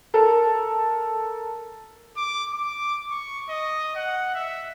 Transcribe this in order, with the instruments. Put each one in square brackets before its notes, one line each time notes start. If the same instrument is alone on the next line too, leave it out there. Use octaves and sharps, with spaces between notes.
[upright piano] A4 A#4
[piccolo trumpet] D6
D6
C#6
D#5
F#5
E5